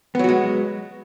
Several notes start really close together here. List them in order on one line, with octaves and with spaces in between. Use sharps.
B3 F#3 F#4 G#3